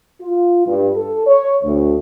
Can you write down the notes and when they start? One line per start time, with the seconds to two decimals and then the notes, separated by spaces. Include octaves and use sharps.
0.22 F4
0.67 G2
0.96 A4
1.27 C#5
1.64 D2